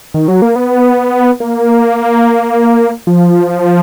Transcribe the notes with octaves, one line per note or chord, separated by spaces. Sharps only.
D#3
F#3
A#3
B3
A#3
F3